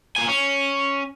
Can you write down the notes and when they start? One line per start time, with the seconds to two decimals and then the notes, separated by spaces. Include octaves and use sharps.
0.16 A#2 G#5
0.29 C#4